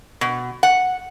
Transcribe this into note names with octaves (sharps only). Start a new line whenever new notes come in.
B2
F#5